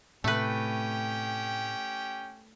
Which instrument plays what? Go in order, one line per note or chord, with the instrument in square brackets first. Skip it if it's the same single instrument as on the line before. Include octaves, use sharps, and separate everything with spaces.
[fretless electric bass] A2 C3 [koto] A3 B4 [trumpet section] C#4 G4 G5